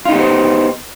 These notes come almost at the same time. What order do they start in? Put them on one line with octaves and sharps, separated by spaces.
F4 D#4 G4 B3 C5